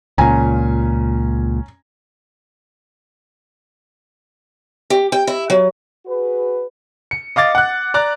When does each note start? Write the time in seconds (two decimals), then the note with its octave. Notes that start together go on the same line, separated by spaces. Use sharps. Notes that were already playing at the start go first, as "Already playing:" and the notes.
0.18 C#2 A#2 C#4 G#5 A#5
4.90 G4
5.12 G5
5.27 E4
5.50 F#3
6.06 F#4 G#4 B4
7.11 C#7
7.36 D#5 F5 D6 A6
7.55 F#5 F#6
7.94 D5 A#5 F#6